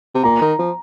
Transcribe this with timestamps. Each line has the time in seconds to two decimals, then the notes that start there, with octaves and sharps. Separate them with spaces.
0.15 C3
0.24 A#2 A#5
0.42 D#3
0.59 F3